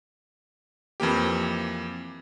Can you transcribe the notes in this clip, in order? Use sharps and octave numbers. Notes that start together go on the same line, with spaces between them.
F2 E3 A#3 G4